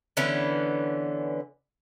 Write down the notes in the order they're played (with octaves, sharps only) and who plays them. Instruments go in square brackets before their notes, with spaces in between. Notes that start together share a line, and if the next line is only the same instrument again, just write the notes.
[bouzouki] D3 E3 B3 C#4